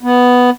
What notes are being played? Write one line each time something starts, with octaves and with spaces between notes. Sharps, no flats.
B3